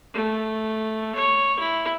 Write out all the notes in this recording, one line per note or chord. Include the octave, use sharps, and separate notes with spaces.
A3
C#5
E4